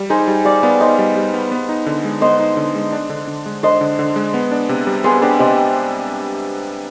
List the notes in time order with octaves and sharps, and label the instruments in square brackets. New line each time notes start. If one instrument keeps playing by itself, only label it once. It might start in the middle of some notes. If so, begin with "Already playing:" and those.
Already playing: [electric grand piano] G3
[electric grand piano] D#4 [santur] G#4 C5
[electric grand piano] G3
[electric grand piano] G3 [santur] D5 F5
[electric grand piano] B3 [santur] D5 F5
[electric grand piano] D#4 [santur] C5 D#5
[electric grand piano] G3
G3
B3
B3
D#4
D3
G#3
[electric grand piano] B3 [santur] C5 D#5
[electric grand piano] D#4
D3
G#3
D4
D3
D3
G#3
[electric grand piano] D4 [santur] C5 D#5
[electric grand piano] D3
D3
G#3
B3
D4
C3
G3
[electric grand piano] B3 [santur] G#4 C5
[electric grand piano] D4 [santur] G4 B4
[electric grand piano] C3 [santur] C5 D#5